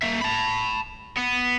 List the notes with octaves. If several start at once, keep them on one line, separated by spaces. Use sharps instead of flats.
A#3 E5
A5 B5
B3